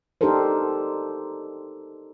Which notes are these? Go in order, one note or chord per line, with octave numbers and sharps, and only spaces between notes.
D4 D#4 G4 A4 A#4 C5